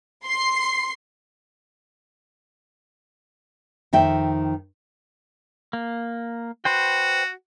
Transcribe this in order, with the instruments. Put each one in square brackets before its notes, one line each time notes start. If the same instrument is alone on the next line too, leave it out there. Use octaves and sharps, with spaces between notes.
[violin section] C6 C7
[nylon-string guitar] F2 D#3 E5 G5
[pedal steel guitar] A#3
[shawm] F#4 [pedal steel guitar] B4 C5 G5